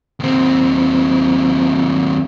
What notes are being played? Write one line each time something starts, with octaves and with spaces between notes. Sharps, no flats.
D#2 C4